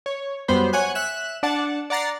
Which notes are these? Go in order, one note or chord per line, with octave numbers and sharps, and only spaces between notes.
C#5
F#2 G3 B3 C5 B5
C#5 F#5 G#5 F#6
E5 F#6 E7
D4 D5 F#5 A5
D5 F#5 A#5 A6 C7